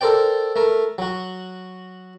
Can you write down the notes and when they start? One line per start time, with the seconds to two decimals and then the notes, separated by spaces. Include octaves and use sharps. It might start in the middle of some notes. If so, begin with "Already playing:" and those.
0.01 A4 A#4 C5 D5 G5
0.56 A3 A#4
0.98 F#3 F#4